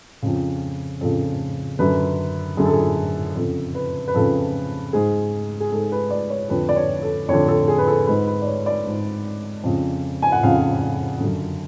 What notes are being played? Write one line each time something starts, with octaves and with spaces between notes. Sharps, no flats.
F2 C#3
F2 C#3 A4
F#2 D3 B4
F#2 D3 G#4
A4
G#4
F2 C#3 A4
B4
B4
F2 C#3 A4
G#2 G#4
G#4
G#2 A4
B4
D5
C#5
F2 D3 B4
D5
C#5
A4
F2 D3 C#5
A4
G#4
B4
A4
G#2 B4
B4
D5
C#5
D5
G#2
F2 C#3
G#5
F#5
F2 C#3 F5
F#2 D3